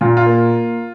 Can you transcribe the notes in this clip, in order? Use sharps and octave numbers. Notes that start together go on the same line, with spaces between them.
A#2 F4
F4
A#3